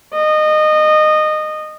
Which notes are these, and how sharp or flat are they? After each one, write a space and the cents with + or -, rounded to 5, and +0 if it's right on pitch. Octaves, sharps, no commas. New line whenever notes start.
D#5 -20